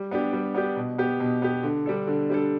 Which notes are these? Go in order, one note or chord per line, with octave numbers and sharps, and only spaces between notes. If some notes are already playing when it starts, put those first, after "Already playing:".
Already playing: G3
B3 D4 G4
G3
B3 D4 G4
B2
B3 G4
B2
B3 G4
D3
G3 D4 A4
D3
G3 D4 A4